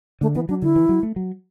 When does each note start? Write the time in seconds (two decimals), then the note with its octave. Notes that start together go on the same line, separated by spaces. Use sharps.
0.21 D3 A3
0.35 E3 B3
0.49 F#3 D4
0.62 D3 E4
0.76 E3
0.89 F#3
1.03 A3
1.16 F#3